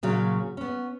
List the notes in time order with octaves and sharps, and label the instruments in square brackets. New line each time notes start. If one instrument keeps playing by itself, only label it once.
[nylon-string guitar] A#2 C#3 F#3
B3 C#4